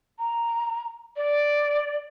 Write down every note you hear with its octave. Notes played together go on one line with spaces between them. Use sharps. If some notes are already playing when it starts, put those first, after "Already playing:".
A#5
D5